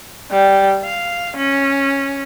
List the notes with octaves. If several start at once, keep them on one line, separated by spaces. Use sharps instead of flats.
G3
F5
C#4